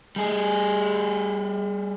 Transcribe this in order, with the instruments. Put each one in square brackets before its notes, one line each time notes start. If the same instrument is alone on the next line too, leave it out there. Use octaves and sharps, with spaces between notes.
[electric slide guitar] G3 G#4